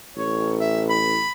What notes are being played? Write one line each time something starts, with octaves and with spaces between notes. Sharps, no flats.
A1 C#5
E5
B5